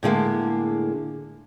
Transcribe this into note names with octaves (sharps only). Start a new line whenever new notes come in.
A2 D3 G#3 A#3